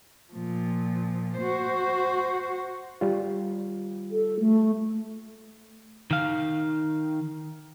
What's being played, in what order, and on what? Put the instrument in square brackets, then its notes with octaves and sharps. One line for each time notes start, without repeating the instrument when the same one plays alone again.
[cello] A#2 F3
F#4 C5
[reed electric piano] G3 F4
[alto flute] A4
A3
[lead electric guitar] D#3 F5